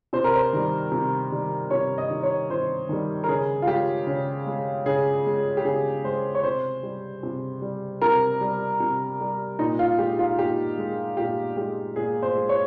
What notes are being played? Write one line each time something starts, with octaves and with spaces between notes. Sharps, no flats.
C3 C5
A#4
C5
D#3 G3
C3
D#3 G3
C3 C#5
D#5
D#3 G3
C#5
C3 C5
D#3 G3
A#4
C#3 G#4
F4
G#3 G4
C#3
G#3
C#3 G#4
G#3
G4
C#3 G#4
G#3 C5
C#5
C3 C5
G3
C3
G3
C3 A#4
G3
C3
G3
A#2 D#4
F4
G#3 G4
F4
A#2 G4
G#3
A#2 G4
G#3 G4
A#2 G#4
C5
G#3
C#5